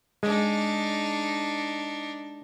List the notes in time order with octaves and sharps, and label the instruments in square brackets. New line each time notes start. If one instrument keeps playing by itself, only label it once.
[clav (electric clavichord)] G#3 [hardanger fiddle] D4 D#4